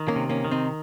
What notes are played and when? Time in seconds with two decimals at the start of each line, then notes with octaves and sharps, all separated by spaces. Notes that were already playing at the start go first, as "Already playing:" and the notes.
Already playing: D#3
0.08 A#3 C#4
0.16 C3
0.29 A#3 C#4
0.45 D#3
0.51 C4 D#4